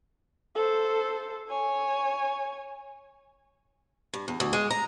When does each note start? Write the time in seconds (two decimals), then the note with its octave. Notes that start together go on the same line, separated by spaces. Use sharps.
0.55 A4 C5
1.49 C#5 G#5
4.13 G2
4.28 E2
4.40 D2
4.53 G#3
4.70 A#5